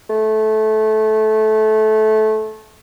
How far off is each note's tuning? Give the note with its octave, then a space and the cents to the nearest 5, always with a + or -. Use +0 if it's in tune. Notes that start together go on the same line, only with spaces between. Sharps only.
A3 -20